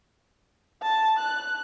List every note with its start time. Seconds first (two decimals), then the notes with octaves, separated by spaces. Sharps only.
0.82 A5
1.19 F#6